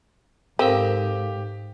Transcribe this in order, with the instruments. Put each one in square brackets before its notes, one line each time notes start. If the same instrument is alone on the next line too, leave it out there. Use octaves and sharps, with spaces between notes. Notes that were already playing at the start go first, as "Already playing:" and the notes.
[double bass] G#2 [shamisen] C4 [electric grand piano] G4 [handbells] A4 A#4 F5